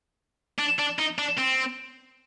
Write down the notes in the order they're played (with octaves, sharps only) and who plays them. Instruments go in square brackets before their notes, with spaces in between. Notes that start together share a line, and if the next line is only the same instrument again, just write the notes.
[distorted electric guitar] D4
D4
D#4
D4
C4